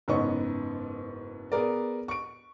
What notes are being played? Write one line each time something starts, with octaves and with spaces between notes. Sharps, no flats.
F#1 G#2 B3 C#4 D#5 C#6
B3 G#4 A#4 D5
C#6 D7